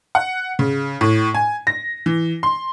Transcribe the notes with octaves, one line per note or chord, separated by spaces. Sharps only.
F#5
C#3
A2
G#5
A#6
E3
C6